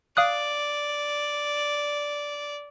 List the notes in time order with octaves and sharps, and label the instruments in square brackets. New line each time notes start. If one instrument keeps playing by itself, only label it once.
[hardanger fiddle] D5 [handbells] F5 D#6 F#6